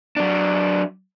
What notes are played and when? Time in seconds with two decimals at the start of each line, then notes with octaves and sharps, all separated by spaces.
0.17 F#3 D4